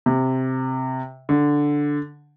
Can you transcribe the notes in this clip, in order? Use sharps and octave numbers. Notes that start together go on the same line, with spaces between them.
C3
D3